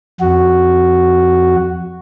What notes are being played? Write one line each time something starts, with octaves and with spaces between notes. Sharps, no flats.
F2 F#4